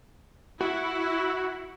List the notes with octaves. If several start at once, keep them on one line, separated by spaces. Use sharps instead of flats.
E4 F#4